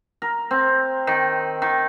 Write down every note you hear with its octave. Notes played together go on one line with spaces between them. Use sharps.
A#4
C4
D#3
D#3